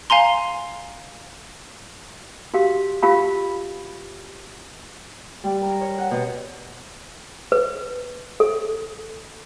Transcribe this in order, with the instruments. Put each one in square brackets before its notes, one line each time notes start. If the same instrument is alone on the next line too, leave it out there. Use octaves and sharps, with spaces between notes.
[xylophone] F5 G#5 A#5 C6
[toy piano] F#4 G4 F5
F4 G4 F5 B5
[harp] G3
A#4
C#5
F#5
B2
[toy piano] B4
A4